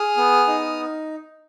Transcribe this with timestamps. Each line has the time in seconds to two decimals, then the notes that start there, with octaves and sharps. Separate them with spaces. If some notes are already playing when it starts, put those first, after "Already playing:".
Already playing: G#4 D#6 F6
0.17 B3
0.47 D#4